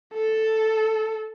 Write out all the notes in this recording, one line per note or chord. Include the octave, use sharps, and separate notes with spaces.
A4